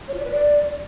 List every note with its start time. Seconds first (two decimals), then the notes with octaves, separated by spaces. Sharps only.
0.08 C#5
0.14 F4
0.19 D5
0.25 B4
0.31 D5